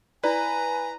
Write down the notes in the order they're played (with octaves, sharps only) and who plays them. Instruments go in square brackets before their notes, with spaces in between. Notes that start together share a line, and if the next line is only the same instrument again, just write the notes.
[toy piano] E4 D5 [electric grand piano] B4 [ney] G#5 [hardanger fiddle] A#5